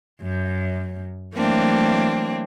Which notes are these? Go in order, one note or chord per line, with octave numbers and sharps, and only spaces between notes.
F#2
E3 F#3 A3 A#3 C4 D4